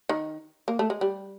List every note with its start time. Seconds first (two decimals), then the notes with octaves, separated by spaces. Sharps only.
0.09 D#3
0.68 A#3
0.79 A3
0.90 G#3
1.01 G3